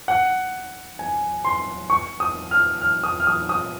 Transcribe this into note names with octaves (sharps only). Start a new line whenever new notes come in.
F#5
G#5
C6
C#6
D#6
F6
F6
D#6
F6
D#6
D#6